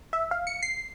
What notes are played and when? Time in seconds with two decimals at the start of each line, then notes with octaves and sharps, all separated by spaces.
0.13 E5
0.31 F5
0.47 C#7
0.63 C7